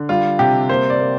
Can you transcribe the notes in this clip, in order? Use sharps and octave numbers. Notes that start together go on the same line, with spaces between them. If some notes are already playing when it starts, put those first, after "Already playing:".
Already playing: D3
G3 F4
C3 G4
A#3 C5
D5
A#3